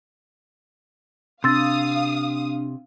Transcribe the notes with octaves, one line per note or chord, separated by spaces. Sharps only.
C3 D4 F5 C6 D#6 E6 A6